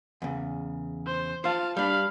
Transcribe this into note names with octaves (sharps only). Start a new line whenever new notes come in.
E2 C#3
C5
F4 C5 F5 A5
G3 D4 F5 B5